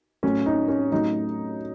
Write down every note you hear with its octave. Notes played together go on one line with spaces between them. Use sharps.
A2 F#3 A3 C#4
D#4
C#4
A2 F#3 A3 D#4